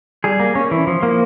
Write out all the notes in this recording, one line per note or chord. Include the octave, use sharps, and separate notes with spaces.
G3 G#4
A#3
C#4
E3
F3
A#3